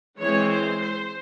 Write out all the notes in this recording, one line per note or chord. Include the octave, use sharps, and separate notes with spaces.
E3 G#3 C4 C#5
C5
C5